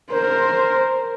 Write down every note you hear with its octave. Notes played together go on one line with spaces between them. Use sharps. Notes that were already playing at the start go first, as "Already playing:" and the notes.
A#4 C5